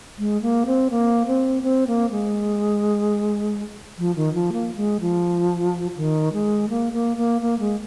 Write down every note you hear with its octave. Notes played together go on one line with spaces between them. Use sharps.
G#3
A#3
C4
A#3
C4
C4
A#3
G#3
F3
D#3
F3
A#3
G#3
F3
D#3
G#3
A#3
A#3
A#3
A#3
G#3